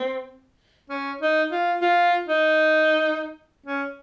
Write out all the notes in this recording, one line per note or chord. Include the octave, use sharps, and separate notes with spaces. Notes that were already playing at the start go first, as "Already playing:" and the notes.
Already playing: C4
C#4
D#4
F4
F4
D#4
C#4